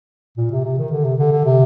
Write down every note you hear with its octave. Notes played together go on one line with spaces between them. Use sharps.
A#2
C3
C3
D#3
D3
C3
D3
D3
C3